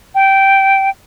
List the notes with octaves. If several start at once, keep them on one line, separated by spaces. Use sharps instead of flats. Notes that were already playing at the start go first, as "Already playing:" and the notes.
G5